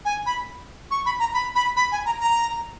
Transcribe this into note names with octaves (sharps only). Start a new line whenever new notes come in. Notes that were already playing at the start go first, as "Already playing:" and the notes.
G#5
B5
C#6
B5
A#5
B5
B5
B5
G#5
A#5
A#5